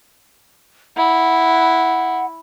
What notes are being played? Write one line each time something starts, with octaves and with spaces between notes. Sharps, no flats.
E4 F#5